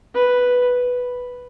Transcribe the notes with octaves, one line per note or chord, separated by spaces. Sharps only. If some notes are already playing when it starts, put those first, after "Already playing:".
B4